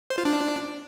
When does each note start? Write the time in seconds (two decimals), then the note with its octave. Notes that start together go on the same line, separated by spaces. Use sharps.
0.10 C5
0.18 F4
0.25 D4